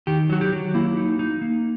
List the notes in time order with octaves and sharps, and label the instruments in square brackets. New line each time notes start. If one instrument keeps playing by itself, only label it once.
[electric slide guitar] D#3 G4
F#3 F#4
G4
F#3
A#3 E4
D#4
D#4
A#3